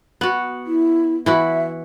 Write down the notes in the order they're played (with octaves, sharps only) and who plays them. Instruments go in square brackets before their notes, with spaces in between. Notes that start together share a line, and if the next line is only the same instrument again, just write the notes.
[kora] B3 F#4
[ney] E4
[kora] E3 E4 F#4 [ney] E5